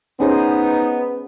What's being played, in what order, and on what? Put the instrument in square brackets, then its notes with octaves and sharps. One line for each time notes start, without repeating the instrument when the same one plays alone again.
[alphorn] B3 [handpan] C#4 G#4 C5 [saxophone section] D#4